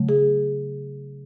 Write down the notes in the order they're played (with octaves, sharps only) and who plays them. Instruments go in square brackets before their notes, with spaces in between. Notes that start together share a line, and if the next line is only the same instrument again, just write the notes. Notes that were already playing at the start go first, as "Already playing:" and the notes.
Already playing: [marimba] C#3 F#3 A3
G#4